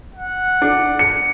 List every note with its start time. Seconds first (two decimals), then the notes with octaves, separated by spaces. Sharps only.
0.15 F#5
0.62 D4
0.99 C#7